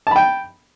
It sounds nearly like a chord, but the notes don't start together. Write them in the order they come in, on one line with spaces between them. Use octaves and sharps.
A5 B5 G5